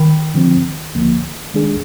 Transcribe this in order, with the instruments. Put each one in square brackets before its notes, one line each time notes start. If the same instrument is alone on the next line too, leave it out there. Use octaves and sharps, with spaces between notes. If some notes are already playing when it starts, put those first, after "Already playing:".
Already playing: [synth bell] D#3
[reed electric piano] D3 F3 C4
D2 D3 F3 A#3
D#3 G#3 D4 G#4